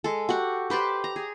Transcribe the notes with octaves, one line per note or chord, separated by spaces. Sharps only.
G#3 A4
F#4 G4 F#5
G4 B4 C5 D5
A#5
G#4